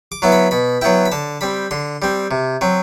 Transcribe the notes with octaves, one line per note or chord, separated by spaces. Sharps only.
D6
F#3 B3 E4
B5
B2 B5
F#3 B3 E4 G5
B5
D3 A5
G3 C4 B5
D3 C6
G3 C4
C3
F#3 C4